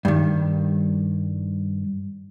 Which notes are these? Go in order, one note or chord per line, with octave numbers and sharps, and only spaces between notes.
G2 D#3